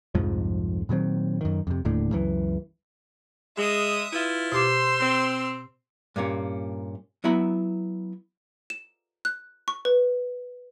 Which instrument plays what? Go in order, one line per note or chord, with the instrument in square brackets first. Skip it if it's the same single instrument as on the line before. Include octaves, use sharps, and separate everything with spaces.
[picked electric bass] C2 F2 G#2 F3
A#2 D#3 F#3 C4
F#2 D#3
F2 C3
D#1 D#2 A2 D3
C#2 F#2 E3
[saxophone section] G#3 [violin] E5 D#6
[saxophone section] E4 F4 B4
[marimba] B2 G4 D6 [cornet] C5 [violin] C6 E6
[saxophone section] C4
[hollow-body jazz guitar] G2 A#2 A#3 C#4
F#3 B3 E4 A#5 B5
[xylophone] E7
F#6
C#6
B4